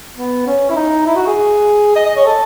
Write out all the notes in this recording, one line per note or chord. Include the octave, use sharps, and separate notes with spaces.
B3
C#4
E4
D#4
E4
F#4
G#4
D#5
D#5
C#5
A4